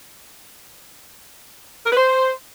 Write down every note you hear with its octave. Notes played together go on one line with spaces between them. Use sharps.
A#4
B4
C5